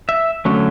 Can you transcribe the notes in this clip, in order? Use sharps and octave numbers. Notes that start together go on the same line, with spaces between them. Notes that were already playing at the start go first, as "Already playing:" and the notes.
E5
D3 F#3 A3 C#4